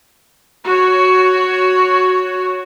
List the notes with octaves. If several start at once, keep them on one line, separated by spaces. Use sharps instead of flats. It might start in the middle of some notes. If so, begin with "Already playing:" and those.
F#4 C#5